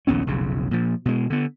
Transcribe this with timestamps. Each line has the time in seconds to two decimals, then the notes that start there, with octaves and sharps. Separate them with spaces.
0.07 A#1 D#2 B3 C#4
0.27 F1 B1 C#3
0.71 A#2 F3
1.05 B2 G#3
1.30 D3 B3